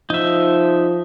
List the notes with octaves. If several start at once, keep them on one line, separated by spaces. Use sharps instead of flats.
F3 D#4 E5